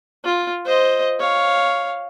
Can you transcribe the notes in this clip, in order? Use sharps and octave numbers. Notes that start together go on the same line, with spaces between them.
F4
C5 D#5
C#5 F5